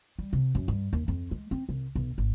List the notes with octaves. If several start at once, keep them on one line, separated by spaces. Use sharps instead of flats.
G3
C3
F#2
G2
D#2
F2
G#3
C4
C2
B1
G#1